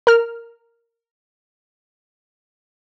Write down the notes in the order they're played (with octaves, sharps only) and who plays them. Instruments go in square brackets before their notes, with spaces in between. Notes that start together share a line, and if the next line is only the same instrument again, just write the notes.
[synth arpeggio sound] A#4 F6